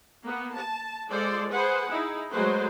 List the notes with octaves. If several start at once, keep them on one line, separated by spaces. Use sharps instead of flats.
A#3 B3
A5
G#3 F4 A4 C5 D5
G#4 B4 C5 F#5
D#4 E4 G#4
F#3 G#3 A3 B4 C5